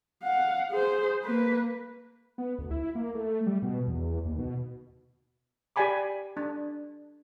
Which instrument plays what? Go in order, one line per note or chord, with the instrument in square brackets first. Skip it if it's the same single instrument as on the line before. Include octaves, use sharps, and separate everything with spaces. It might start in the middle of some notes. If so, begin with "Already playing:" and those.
[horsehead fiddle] F5 F#5
G#4 C5
A#3 B4
[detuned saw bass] B3
D2
E4
A#3
A3
G3
B2
E2
D#2
B2
[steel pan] G4 D5 G5 G#5 B5 D6
D4